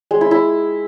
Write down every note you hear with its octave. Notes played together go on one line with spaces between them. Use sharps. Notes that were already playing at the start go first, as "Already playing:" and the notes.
G#3
E4
E4